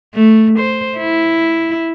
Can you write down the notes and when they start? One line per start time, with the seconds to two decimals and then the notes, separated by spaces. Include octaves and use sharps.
0.15 A3
0.59 C5
0.97 E4